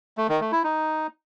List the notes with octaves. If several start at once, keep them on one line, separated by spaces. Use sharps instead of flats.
A3
D#3
A3
E4
D#4